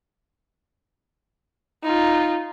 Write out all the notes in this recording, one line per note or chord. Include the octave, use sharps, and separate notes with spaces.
D#4 F4